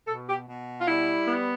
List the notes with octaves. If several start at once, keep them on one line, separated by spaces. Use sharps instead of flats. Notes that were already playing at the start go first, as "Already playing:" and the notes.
B2 A4
G4
B2
F4
G3 E4
B3